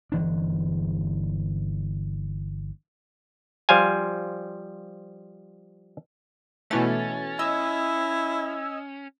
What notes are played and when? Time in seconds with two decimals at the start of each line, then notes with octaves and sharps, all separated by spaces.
0.12 G1 E3 D4
3.69 F3 G3 C5 F5 G#5
6.71 B2 E3 A3 C#4 A6
7.39 E4 D#5 E6 G#6